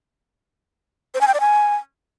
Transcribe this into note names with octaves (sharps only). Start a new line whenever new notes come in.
C5
G#5
G5
D5
G#5